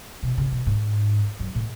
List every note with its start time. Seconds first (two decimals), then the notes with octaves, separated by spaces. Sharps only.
0.23 B2
0.38 C#3
0.52 B2
0.66 G#2
1.40 F#2
1.55 A2